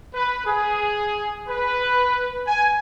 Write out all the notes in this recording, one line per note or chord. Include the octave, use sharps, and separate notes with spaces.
B4
G#4
B4
G#5